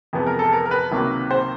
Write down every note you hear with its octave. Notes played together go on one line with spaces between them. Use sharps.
F2 C3 E3 G#3 B3
A#4
A4
A#4
A#4
B4
C#2 C3 D#3 F#3 A#3
C5